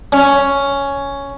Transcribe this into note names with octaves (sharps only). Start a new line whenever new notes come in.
C#4